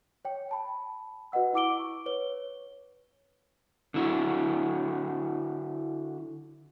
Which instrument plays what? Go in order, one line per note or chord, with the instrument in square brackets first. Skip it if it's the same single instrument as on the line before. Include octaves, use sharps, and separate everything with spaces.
[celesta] C#5 G5
G5 A5 B5
F#4 B4 D#5 F#5 E6
E4 F#5 D6 E6 D7 G7
C#6
B4 C#5 G7
[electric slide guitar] D3 E4 F#4